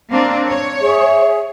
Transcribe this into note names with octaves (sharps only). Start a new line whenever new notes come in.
A#3 C4 D4
C#5
G#4 E5